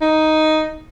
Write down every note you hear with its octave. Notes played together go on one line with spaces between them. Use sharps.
D#4